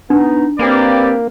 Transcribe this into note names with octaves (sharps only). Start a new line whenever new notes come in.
B3 D4 D#4
A#3 C4 G4 B4 D5